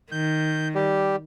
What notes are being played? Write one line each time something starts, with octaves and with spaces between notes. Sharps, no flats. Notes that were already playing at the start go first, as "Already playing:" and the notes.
D#3 G6
G3 G4